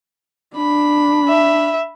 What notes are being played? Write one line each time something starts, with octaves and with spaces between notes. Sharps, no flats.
D4 B5
E5